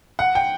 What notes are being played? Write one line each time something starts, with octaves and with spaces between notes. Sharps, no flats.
F#5
G5